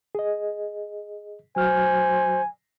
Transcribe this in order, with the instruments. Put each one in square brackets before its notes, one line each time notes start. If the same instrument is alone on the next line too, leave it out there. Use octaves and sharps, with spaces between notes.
[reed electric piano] G#4 D#5
[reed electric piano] F#3 F#4 F6 [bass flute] C5 [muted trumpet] G#5